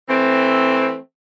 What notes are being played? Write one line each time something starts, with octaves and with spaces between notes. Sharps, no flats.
E3 A3 C4